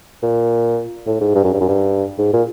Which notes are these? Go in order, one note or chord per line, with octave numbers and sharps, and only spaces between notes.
A#2
A2
G#2
G2
F#2
G2
F#2
G2
G#2
A#2